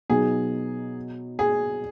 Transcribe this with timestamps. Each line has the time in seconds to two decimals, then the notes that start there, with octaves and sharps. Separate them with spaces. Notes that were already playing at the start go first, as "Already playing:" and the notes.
0.10 B2 F#3 B3 D#4 G#4
1.39 G#4